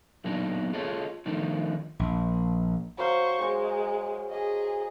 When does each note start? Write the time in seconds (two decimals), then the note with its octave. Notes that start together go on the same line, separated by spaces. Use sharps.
0.24 F#2 A#2 F#3 B3 D4 D#4
0.73 F4 G#4 A4 C#5 D#5
1.26 D#3 F3 A3 D4 D#4
1.99 A#1
2.98 F#3 C5 F5 C#6
3.42 G#3 C5
4.31 G#4 D#5